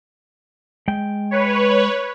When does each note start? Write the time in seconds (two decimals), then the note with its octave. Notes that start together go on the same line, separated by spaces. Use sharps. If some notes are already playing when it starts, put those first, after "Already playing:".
0.88 G#3 G5
1.31 B4 C#5